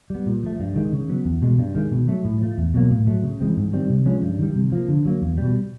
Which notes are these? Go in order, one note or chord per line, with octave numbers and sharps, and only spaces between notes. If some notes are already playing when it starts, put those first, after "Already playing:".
G3 B3
A#2
F3 A3
G2
D#3 G#3
C#3
F#3 B3
E2
B2 G#3
G2
D#3 G#3
B2
F#3 A3
A2
F3 A3
E2
B2 F#3 A#3
A2
F#3 A3
C#3
E3 G#3 C4
G#2
D#3 G3 C4
C3
F3 G#3 C#4
G2
D#3 G3
C3
F3 A#3
D3
F#3 A#3
E2
B2 G3